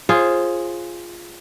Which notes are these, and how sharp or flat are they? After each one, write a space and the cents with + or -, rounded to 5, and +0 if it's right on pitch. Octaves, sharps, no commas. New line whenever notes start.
F4 -5 G#4 +0 C5 +30